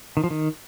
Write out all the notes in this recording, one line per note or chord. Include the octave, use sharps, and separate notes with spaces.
D#3
F3
D#3